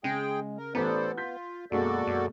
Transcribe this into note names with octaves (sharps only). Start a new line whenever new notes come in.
C#3 G#3 G#4 G5
A#4
A1 B3 A4 B4 C5 D5 A#5
F4 G6 B6
F#2 B2 G#3 A#3 F#4 A4 D5
F#2